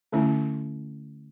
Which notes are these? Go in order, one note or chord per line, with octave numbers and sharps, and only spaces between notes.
D3 A3 C#4 E4